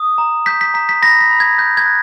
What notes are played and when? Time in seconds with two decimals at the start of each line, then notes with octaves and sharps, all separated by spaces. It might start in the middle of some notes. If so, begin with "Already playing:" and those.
Already playing: D#6
0.18 A#5
0.46 G6 B6
0.61 B6
0.74 A#5 B6
0.89 B6
1.02 B5 A#6
1.21 B6
1.30 B5
1.40 G#6
1.58 F#6 G6
1.77 G#6
1.86 F#6